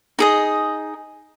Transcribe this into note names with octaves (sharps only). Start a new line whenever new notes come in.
D#4 G#4 D#5